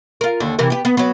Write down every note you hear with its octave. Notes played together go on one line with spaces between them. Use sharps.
F4 A#4
D#2 D3
C3 E3 A#4
B3 G4
B3
F#3 B3